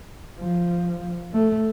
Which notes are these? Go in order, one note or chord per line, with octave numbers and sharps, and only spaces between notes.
F3
A3